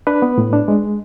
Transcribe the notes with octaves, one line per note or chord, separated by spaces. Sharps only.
D4 B4
B3
A2
D4
G#3